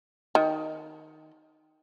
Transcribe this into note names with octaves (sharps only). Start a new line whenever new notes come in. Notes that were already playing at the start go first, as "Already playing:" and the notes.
D#3